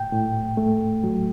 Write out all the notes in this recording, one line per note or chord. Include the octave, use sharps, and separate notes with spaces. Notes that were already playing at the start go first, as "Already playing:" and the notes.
Already playing: A2 G5
A2
A3
F#3